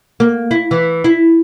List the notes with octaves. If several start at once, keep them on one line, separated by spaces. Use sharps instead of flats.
A#3
E4
E3
E4